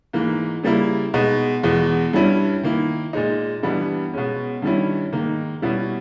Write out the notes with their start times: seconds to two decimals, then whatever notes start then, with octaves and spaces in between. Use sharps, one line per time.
0.13 G#2 E3 A#3
0.63 C#3 G3 A#3 E4
1.14 B2 G#3 D#4
1.63 E2 B2 G#3
2.13 G2 G3 C#4 E4
2.63 D#3 A#3 E4
3.13 A#2 G#3 D#4
3.63 G2 E3 G3 B3 E4
4.13 B2 G#3 C#4
4.62 G2 D#3 G3 C#4 E4
5.13 G#2 D#3 A#3
5.62 B2 G3 C#4 E4